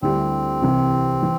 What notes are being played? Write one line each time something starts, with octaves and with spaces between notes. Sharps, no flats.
D2 D3 G3 C4 E4 G4
C2 C3 E3
E3